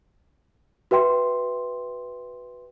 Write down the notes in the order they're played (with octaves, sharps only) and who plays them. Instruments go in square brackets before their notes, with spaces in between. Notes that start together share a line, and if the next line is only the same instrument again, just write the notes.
[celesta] F#4 B4 E5 G5 C6